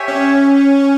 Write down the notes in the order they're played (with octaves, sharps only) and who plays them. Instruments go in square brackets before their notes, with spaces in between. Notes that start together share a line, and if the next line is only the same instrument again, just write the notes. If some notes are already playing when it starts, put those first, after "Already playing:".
Already playing: [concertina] G4 C#5 E5 G#5
[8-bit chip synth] C#4